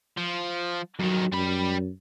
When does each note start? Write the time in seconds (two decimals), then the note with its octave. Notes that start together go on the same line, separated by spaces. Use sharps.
0.17 F3
0.99 F2 D#3 F#3
1.32 F#2 G3 B5